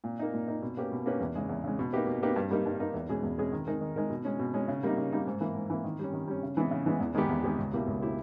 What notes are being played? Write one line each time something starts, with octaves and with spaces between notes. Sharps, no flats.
A#2
A#3 D#4
A#2
A#3 D#4
B2
A#3 C#4 G4 B4
B2
A#3 C#4 G4 B4
E2
C#3 G#3
E2
C#3 G#3
B2
A#3 D#4 G4 B4
B2
A#3 D#4 G4 B4
G2
G3 A#3 D#4 A#4
G2
G3 A#3 D#4 A#4
E2
B2 G#3 C#4 G#4
E2
B2 G#3 C#4 G#4
D#3
G#3 D#4 A#4
D#3
G#3 D#4 A#4
B2
G#3 C#4
B2
G#3 C#4
C#3
G3 A#3 D#4
C#3
G3 A#3 D#4
G#2
E3 A#3
G#2
E3 A#3
D#3
G3 C#4
D#3
G3 C#4
C#3
E3 G#3 B3
C#3
E3 G#3 B3
E2
D#3 G#3 B3 G4
E2
D#3 G#3 B3 G4
C#2
B2 A#3 E4 G4
C#2
B2 A#3 E4 G4